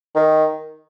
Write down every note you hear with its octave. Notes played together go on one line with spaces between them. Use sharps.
D#3